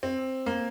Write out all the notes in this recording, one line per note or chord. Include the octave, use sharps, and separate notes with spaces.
C4
A#3